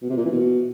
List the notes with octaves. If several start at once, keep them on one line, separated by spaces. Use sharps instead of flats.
B2
C3
A#2
E3
B2